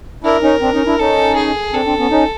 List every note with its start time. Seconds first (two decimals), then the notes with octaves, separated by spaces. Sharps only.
0.24 D4 E4 A#4
0.42 C#4 D#4
0.61 C4 D4
0.73 C#4 D#4
0.86 D4 E4
0.99 C#4 D#4 A4
1.36 G#4
1.73 C4 D4 A4
1.86 C4 D4
1.98 B3 C#4
2.11 C#4 D#4